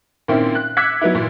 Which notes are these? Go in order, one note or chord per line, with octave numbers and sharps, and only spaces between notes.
A#2 D#3 A#3 C4 C#4 E4
F#6
D6 E6 F#6 G#6 B6 C#7
F#3 B3 D#4 E4
A#2 E3